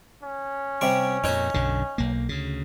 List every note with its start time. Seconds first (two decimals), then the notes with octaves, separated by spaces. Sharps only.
0.23 C#4
0.81 C3 G3 C#6
1.24 F2 A#2 D#4 C#5
1.54 B1 F#2 D3
1.98 B1 A#3
2.29 D2 C#3